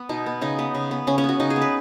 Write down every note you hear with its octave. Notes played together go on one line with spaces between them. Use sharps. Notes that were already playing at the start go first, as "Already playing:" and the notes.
Already playing: B3
B2 D#4
B3
C#3 D#4
B3
C#3
B3
C#3 C#4
C#4
B3 F#4
C#3 D#4
G#4
B3
B4